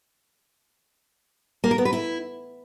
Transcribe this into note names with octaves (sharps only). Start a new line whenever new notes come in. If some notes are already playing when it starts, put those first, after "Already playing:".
A#3
A#4
B3
B4
E4